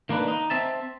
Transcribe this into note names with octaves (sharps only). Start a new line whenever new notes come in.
D#3 A#3 D4 B4
D#4
C4 E5 A5